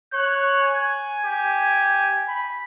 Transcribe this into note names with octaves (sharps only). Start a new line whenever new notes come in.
C#5 F#6
G#5
G4
B5